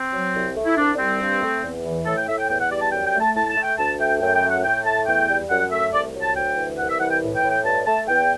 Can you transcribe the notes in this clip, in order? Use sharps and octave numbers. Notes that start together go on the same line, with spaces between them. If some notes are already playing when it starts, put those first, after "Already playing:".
Already playing: C4
F#3
C2
A3
E4
C2 D4
D4
G3 C4
G2
A3
E2
E3
A2 A4
G5
A2 E5
G5
E2 G5
F#5
G3 D5
A5
F#2 G5
G5
A3
A5
A2 A5
A5
A3
G5
D2 A5
A3 G5
F#2 G5
G5
A3
F#5
A2 G5
A3 A5
E2 G5
G3
F#2 F#5
A3 E5
C2 D5
F#3
A5
D2 G5
E3
C2 F#5
E5
E3 F#5
G5
A2
G5
A2
G5
G2 A5
A3 A5
E2 G5